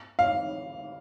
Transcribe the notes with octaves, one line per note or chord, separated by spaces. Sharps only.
F5